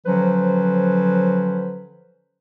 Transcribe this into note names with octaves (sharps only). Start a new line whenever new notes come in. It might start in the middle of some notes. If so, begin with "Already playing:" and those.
D3 F3 F#3 C#4 B4 C5